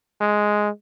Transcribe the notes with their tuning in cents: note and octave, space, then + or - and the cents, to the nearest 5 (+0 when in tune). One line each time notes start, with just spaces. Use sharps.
G#3 +5